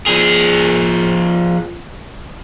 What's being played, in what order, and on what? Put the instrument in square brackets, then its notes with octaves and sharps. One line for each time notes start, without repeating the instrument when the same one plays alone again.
[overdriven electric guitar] F3 G#4